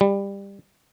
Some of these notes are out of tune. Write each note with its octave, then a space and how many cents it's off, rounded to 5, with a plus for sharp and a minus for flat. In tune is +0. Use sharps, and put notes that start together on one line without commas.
G3 +20